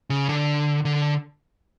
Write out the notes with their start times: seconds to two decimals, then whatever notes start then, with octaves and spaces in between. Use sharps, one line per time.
0.10 C#3
0.29 D3
0.85 D3